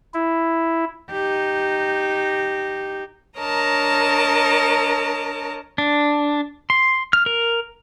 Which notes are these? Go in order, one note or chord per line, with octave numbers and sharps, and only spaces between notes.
E4
D#4 G4
D4 A#4 C#5 D#5 A5 A#5
D4
C6
F6
A#4